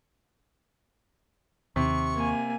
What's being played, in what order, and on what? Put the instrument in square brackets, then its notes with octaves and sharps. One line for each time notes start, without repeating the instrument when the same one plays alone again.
[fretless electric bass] D#2 [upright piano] C3 [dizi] C#6
[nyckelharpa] A#3 G#5